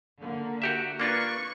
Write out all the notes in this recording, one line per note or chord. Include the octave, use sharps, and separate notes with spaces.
D3 A#3
F#4 G4 E5
A#3 D4 F4 B4 C#6 C#7